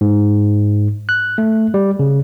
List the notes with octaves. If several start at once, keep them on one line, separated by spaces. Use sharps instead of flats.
G#2
F#6
A3
G3
C#3